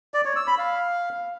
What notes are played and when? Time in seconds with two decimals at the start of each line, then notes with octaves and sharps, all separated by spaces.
0.14 D5
0.25 C#5
0.36 E6
0.47 B5
0.58 F5